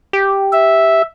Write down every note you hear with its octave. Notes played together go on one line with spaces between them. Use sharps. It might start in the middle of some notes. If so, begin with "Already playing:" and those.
G4
E5